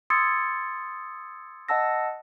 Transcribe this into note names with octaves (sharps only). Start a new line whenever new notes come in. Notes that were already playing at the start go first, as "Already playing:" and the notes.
C6 D#6 E6 G#6 A6 C#7
D#5 F#5 A5 E6 A#6